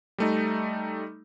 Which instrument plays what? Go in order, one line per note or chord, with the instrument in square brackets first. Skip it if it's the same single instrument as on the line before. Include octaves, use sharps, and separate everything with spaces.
[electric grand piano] G3 A3 D#4